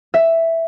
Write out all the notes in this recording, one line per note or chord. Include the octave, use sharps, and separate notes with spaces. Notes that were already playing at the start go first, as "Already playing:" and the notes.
E5